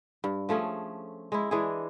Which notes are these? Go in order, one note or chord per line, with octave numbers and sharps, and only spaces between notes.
G2
F3 A3 C#4 G#4
G#3 E4
E3 G#3 D4 G#4